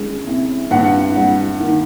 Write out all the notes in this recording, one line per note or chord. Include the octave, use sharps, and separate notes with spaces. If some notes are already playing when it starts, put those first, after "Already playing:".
Already playing: G#3 C#4
C2
G2 F#5
G3
D#3